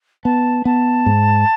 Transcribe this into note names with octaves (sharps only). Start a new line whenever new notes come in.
B3 A5
B3 A5
G#2